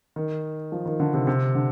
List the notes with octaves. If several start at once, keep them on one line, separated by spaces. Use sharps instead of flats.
D#3
F3
D#3
D3
C3
C3
D3